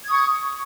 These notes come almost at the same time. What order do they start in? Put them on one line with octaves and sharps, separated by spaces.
G#6 D#6 C#6